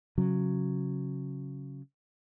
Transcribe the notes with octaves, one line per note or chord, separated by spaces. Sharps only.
C#3 F#3